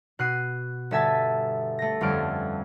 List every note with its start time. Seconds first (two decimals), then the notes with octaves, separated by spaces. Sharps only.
0.19 B2 F#6 C7 D#7
0.91 G1 D3 E5 G#5 A5 B6
1.79 A3 A#6
2.01 G1 F2 G3 C#4 F6 D7